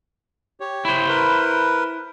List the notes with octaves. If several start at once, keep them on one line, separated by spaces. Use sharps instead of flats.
G4 C#5
E4 C5
A#4 B4